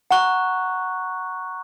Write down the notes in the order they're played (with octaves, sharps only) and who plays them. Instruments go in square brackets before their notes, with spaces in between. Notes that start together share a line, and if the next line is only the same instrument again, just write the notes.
[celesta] F#5 [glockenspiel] A#5 C#6 F#6